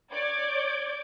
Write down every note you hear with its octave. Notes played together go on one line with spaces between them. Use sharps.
C#5 D5 D6 G6 G#6